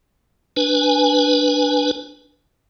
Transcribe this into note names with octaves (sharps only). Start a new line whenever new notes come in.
D4 B4 G#5